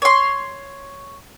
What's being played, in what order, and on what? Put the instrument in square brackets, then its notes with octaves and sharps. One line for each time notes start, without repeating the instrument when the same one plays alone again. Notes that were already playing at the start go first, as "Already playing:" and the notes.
[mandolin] C#5 C6